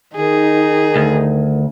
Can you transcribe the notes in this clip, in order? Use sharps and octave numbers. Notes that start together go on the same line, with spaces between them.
D#3 D#4 G#4
D2